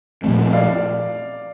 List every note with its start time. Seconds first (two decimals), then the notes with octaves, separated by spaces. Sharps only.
0.24 A#2 F3 A3 C4
0.53 D5 F5